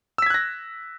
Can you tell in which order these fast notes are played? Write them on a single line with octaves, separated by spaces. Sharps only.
E6 B6 G#6 F#6 A#6